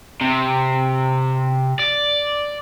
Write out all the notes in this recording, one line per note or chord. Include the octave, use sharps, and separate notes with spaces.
C3
D5